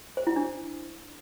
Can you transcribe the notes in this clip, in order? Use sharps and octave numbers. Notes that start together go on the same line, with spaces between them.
C5
E4
D4